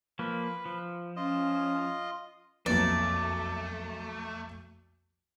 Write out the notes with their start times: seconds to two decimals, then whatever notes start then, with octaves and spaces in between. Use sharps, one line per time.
0.19 F3 A#3 B4
0.66 F3
1.16 C#4 F4 D#5
2.66 B1 F2 A3 A#3 B4 D5